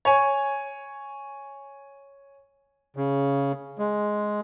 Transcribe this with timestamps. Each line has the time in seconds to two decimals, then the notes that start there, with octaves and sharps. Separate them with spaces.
0.05 C#5 G#5
2.96 C#3
3.79 G#3